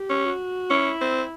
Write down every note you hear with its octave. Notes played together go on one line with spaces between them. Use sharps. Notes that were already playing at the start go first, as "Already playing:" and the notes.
Already playing: G4
C#4
F#4
C#4 E4
C4